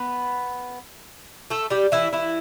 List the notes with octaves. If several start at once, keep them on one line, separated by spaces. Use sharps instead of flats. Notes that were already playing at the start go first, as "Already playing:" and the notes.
Already playing: B3 B4
A3 A4
G3 G4
E3 E4
E3 E4